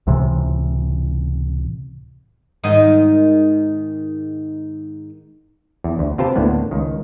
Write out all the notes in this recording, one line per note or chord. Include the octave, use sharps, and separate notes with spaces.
C#2 A2 C3 E3
G#2 D#3 D#4
E2
D2
C3 F4 G4 B4 C5 A5
D2 A2 A#3 B3
C#2 D#3